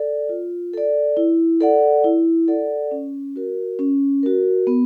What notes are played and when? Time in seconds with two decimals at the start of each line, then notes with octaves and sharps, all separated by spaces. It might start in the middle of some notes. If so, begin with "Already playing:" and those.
Already playing: A4 D5
0.29 F4
0.74 A4 D5
1.17 E4
1.61 A4 D5 F#5
2.04 E4
2.48 A4 D5 F#5
2.91 C#4
3.36 F#4 A#4
3.79 C#4
4.23 F#4 A#4
4.67 B3